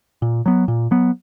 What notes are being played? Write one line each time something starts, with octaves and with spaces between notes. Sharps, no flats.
A#2
F#3 B3
A#2
F#3 B3